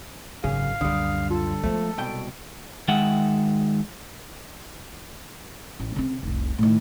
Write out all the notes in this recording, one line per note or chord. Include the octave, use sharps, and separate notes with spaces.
G#1 F#2 C#3 G#4 F5
C#2 F#2 D3 G3 D#6
F4 A4
F3 G#3 A3 B3
C2 B2 G5 D7
D#3 G#3 E5 F#5
A1
C#3 C4
F1 C2
A2 D#3